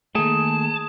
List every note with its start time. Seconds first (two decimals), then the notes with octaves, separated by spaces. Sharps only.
0.15 D#3 A3 A#3 G#4 G#5 A5